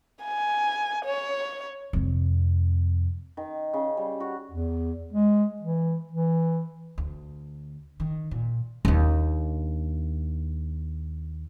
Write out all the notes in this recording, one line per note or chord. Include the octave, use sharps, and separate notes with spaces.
G#5
C#5
F2 C3
D#3
C#3
G3
F#4
E2
G#3
E3
E3
D2
D#3
A#2
D#2 D4